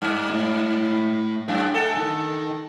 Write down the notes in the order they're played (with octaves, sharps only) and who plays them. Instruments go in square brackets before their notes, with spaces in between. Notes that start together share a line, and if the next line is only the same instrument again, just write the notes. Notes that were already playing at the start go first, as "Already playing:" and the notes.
[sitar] G2
[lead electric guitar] A3 E4
[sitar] F#2 [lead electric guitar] G#4 G5
[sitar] A4 [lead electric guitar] F#5 G#5
[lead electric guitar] D#4 A#4